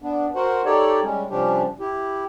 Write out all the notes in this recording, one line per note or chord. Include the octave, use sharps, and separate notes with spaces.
B3 D4
F#4 A#4 C5 F#5
D#4 G4 A4 C#5 D5
G3 G#3 C#4
C3 F3 G3 C#4 D4 G4
E4 G4